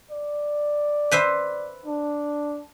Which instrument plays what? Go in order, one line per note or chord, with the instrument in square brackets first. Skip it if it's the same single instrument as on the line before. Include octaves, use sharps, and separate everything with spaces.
[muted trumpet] D5
[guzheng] B4 C5 E5
[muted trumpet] D4